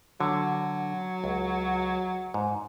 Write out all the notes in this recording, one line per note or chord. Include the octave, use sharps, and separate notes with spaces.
D3 F#3
C#2
G#2